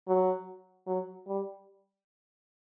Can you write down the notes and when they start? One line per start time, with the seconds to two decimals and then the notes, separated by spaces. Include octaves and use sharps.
0.08 F#3
0.87 F#3
1.27 G3